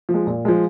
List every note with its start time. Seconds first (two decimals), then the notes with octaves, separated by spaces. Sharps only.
0.09 F3
0.14 G#3
0.27 A#2
0.45 F3 G#3